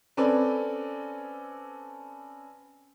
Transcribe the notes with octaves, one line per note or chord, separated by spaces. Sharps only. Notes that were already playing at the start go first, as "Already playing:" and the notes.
C4 C#4 A4 B4 D5 G#5